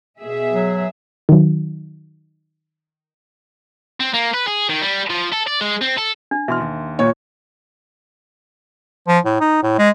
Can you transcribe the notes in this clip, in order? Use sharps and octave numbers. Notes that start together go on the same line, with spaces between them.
B2 G#4 E5
F#3
D#3 F#3
C4
A#3
B4
G#4
D#3
G3
F3
A4
D5
G#3
C4
A4
D4
B2 E3 E5 C6 F6
D#2
A#2 C#5
F3
A2
D#4
A2
G#3